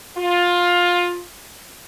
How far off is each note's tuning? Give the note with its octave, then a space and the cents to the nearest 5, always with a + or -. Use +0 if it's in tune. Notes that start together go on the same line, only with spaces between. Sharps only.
F4 +15